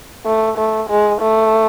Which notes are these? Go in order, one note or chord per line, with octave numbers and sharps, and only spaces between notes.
A3
A3
G#3
A3